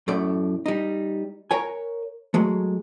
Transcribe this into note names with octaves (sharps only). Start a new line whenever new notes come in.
F#2 A2 A3 D5
G3 D#4
A#4 C#5 G#5
F#3 G#3 A3